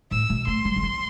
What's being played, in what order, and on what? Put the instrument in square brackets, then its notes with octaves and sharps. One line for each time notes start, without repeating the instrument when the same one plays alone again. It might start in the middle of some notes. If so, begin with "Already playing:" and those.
[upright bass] A2 [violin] E6
[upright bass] B2
[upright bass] A3 [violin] C6
[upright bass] G3
D3
E3